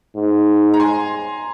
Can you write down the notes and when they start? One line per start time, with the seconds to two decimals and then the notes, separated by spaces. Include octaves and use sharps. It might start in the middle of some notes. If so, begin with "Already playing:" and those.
0.16 G#2
0.74 A#5
0.80 G#5 C6